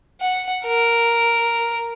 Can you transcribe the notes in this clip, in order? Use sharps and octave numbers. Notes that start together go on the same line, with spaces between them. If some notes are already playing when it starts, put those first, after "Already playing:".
F#5
A#4